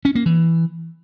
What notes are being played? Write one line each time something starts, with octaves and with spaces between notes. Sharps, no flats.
C#4
A#3
E3